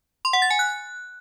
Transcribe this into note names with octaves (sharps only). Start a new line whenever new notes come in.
C6
F#5
A6
G#5
F#6